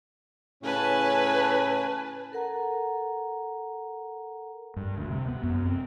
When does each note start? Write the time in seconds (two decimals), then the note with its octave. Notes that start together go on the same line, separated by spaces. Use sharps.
0.63 A2 C#3 C#4 B4 G#5 A5
2.32 A4 A#4 F#5 A#5
4.76 G2
4.98 D2
5.10 C3
5.28 B3
5.43 F#2
5.66 C4